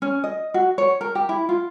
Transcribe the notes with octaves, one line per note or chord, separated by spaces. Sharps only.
C#4
D#5
F#4
C#5
A#4
G4
E4
F4